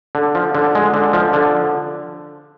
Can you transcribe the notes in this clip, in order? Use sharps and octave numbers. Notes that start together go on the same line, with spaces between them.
D3
F3
D3
G#3
D3
F3
D3